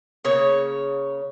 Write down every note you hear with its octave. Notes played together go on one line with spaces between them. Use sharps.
C#3 A#3 C#5